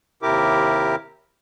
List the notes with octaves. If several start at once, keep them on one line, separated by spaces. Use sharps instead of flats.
D#2 C3 E4 G4 A#4 D6